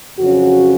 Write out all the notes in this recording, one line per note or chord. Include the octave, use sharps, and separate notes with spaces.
F2 C#3 F#3 C#4 F#4